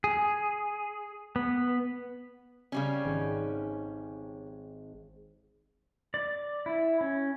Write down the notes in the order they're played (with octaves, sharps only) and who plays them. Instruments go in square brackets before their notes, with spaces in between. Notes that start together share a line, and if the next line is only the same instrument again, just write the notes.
[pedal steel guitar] G#4
B3
[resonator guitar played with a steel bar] C#3 G3 C#4
[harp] G#1 C#5
[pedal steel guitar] D5
E4
C#4